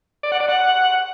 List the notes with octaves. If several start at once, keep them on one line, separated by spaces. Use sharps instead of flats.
D5
F#5
D5
F#5